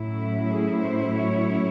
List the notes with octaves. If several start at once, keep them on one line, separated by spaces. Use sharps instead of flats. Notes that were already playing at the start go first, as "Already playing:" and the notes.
Already playing: A2 F#3 C#4 E4
G#4
C5
C#5